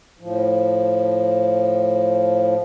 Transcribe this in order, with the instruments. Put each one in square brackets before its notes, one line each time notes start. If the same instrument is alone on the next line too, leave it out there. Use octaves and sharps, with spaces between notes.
[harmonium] A2 F3